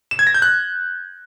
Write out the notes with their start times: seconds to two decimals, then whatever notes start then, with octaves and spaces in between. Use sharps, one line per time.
0.11 E7
0.19 G#6
0.27 A#6
0.34 G6
0.42 F#6